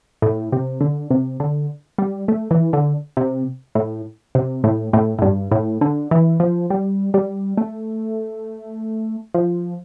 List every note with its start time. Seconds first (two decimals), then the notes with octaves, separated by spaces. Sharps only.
0.22 A2
0.52 C3
0.81 D3
1.11 C3
1.40 D3
1.98 G3
2.28 A3
2.51 E3
2.73 D3
3.17 C3
3.75 A2
4.35 C3
4.64 A2
4.93 A2
5.19 A2
5.22 G2
5.51 A2
5.81 D3
6.11 E3
6.40 F3
6.70 G3
7.14 G3
7.57 A3
9.34 F3